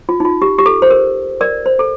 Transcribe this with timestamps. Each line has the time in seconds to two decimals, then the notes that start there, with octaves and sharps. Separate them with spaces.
0.09 F4
0.20 D#4
0.25 F4
0.42 G4
0.58 G4
0.66 A4
0.82 C5
0.91 A#4
1.41 A#4 D5
1.66 C5
1.79 A4